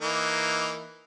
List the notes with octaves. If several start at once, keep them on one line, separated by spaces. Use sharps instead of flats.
E3 A#3 D#4